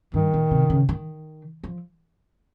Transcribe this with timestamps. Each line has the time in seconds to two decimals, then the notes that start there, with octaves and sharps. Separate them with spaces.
0.14 G2 D#3
0.34 A#2
0.51 C3
0.70 C#3
0.89 D#3
1.64 F3